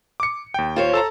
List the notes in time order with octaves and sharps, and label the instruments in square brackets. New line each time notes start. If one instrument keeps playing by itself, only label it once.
[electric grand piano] D6 C#7
D#2 G5
[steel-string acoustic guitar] F4 C5 C#5
[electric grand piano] A4 A5 A#5